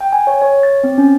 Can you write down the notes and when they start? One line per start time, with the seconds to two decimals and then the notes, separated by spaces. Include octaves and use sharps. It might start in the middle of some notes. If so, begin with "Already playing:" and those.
0.01 G5
0.13 G#5
0.27 C#5
0.42 C#5
0.63 A6
0.84 C4
0.98 C#4